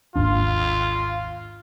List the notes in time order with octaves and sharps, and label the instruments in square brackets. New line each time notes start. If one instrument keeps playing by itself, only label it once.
[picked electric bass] G#1 D#2 D4 [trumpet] F4